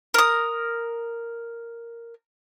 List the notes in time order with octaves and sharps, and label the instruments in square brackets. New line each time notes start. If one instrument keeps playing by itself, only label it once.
[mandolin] A#4 D#6